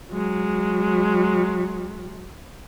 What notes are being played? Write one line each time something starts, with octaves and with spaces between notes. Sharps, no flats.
F#3 G#3